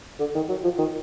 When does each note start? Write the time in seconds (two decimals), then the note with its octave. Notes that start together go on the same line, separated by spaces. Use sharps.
0.19 D3
0.35 D#3
0.49 F#3
0.64 F3
0.78 D#3